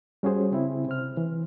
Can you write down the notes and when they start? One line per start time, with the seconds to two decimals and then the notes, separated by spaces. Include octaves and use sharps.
0.23 G3 C#4 F#4 G#4 C5
0.51 C#3 C4 E4
0.86 C3 C5 F6
1.17 E3